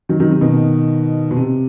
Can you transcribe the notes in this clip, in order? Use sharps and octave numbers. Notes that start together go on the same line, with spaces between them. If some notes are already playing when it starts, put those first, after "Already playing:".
D#3 F#3
D#3 F#3
C3
B2 D#3
B2
C3